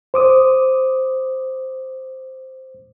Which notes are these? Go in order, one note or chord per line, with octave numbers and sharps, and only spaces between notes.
C5 D6 D#6